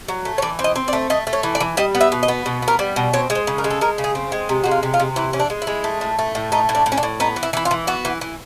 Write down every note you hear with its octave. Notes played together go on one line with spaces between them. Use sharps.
F#3
A3
C#5
E3 D5
C4
D#5
C4
D5
A3
A3 D#5
A3
C#5
E3
D5
E3
G3 D#5
B3
E5
B2
D#5
B3
B2
B3
A#4
G3
B2
C4 C#5
G#3
C5
C#3
A#4
G#3
A4
G#3 A#4
C#3
G#4
C4
G#3
C3
G#3 F#4
F4
C3
F4
C3
E3 E4
E3 C#4
D4
G#3
E4
G#3
A3
A2
A3
A2
A3 D#4
A2
D4
A2
C#4
D4
A2
B3 D#4
E3
E4
E3 E4
F4
E3
B3 F#4
E3
E3